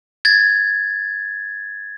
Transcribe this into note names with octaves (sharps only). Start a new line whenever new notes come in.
G#6 A6